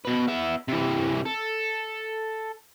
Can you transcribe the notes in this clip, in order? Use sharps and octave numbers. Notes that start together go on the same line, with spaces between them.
B2 B4
B3 E5
C3 E3
A4